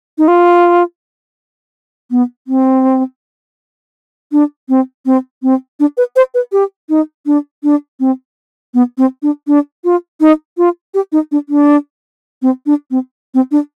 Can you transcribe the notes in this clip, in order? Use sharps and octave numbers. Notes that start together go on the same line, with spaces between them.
D#4
F4
B3
C4
D4
C4
C4
C4
D4
B4
C5
B4
G4
D#4
D4
D4
C4
B3
C4
D4
D4
F4
D#4
F4
G4
D#4
D4
D4
C4
D4
C4
C4
D4